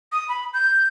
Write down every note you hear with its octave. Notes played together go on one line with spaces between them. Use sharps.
D#6
B5
G6